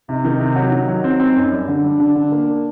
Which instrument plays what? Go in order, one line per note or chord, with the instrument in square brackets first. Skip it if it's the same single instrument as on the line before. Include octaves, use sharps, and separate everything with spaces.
[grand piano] C3 [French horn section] D#4
[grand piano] D#3
[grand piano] C3 [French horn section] D#4
[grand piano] F#3
D#3
F#3
C4
C4
F#2
G3
[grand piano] D3 [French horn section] D4
[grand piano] G3
D3
D3
A#3